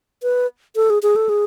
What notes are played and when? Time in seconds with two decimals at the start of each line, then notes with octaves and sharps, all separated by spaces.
0.23 B4
0.76 A4
0.90 G#4
1.03 G#4
1.16 A4
1.29 G#4